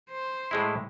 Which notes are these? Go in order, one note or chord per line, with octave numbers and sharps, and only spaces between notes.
C5
A2 G#3 E4